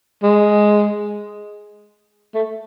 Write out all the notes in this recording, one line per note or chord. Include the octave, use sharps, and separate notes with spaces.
G#3
A3